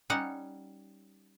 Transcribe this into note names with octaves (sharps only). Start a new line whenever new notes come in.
G3 C#4 D#4 F#5